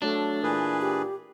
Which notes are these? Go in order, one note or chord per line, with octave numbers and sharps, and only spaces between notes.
F#3 A3 D4
A#2 E3 G#4 B4
G4